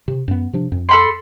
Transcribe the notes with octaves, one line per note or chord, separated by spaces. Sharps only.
C3
F#2 B3
C3 F3 D4
F2
A4 B5 C6